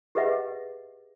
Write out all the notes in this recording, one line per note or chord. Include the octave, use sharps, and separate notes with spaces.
G4 G#4 B4 D#5 E5 F#5